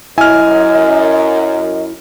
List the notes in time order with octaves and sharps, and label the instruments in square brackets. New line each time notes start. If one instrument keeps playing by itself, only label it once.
[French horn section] F#2 [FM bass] E4 [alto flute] D#5 [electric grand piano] G#5 F6